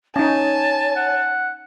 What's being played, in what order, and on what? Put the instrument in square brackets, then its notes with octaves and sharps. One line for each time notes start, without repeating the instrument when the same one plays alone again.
[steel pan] C#4 D#4 [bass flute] C#5 [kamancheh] G#5 A5
[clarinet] F#5